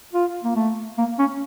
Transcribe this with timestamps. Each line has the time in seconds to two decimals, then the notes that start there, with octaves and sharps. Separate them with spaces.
0.13 F4
0.44 A#3
0.56 A3
0.98 A#3
1.19 C#4